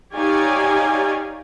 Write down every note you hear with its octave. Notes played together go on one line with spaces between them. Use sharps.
D#4 G4 C#5 D5 F5 G#5